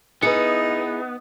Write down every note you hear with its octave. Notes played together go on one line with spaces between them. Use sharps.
B3 D#4 E4 G#4 B4 C#7